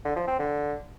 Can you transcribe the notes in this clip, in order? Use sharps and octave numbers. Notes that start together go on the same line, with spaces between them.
D3
F3
C4
D3